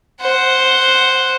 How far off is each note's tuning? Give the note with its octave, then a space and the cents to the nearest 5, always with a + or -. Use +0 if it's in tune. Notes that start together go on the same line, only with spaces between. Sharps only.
C5 +0 F#5 +0